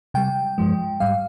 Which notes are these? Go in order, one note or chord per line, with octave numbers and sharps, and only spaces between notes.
C3 G3 G5
G2 F3 G#3
G#2 G3 F5